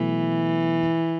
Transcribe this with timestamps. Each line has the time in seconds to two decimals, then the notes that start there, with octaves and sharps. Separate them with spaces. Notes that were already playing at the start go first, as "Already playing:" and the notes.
Already playing: B2 E3 F#3 A3